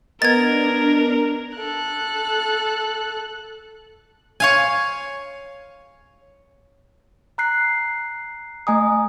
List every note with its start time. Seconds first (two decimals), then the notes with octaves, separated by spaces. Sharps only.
0.22 B3 D4 A#4 D#5 G#6 A6
1.57 A4 F#6
4.40 C#5 F5 G#5
7.38 A#5 F#6 C7
8.67 A3 D#5 G#5 A#5 D#6